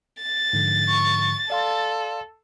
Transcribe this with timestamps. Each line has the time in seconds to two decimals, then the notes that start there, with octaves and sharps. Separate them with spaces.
0.23 A6
0.53 G#2 D3 F3
0.89 C#6
1.50 A4 D5 F5 C6